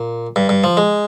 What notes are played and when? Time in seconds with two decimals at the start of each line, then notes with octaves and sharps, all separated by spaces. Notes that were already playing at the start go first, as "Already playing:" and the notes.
Already playing: A#2
0.36 G2
0.49 G2
0.64 F3
0.77 G#3